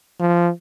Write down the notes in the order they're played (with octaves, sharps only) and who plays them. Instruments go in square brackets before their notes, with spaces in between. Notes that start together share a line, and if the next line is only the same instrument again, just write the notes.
[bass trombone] F3